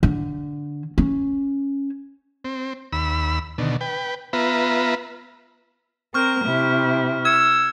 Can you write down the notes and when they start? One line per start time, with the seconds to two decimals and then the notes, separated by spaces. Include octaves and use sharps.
0.03 D3
0.98 C#4
2.45 C4
2.93 D#2 B5 E6
3.58 B2 D3 D#3
3.81 B4 G5
4.33 B3 F4 B4 E5 A#5
6.14 C4 A#4 C#6 F6 G6
6.45 C3 E4
7.25 E6 G#6 C#7